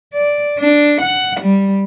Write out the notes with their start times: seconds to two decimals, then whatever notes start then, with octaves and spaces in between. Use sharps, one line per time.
0.13 D5
0.58 D4
1.01 F#5
1.40 G3